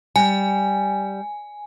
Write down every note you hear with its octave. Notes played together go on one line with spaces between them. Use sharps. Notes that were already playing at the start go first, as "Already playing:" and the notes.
G3 G#5